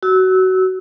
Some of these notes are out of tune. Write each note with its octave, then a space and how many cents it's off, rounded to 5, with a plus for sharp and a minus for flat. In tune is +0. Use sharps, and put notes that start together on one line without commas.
F#4 +20 E6 -25